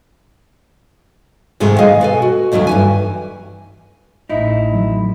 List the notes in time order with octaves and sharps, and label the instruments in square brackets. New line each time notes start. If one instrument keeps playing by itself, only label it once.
[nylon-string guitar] G#2 C3 D#3 G#3 A3
G#3 G#4 D#5 F5
B2 A4 G#5
F#4
D#2 D#3 F#3 A3 C#4
G2 E3 G#5
[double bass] A1 [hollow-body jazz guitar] D#4 E4
[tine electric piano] E3 F#3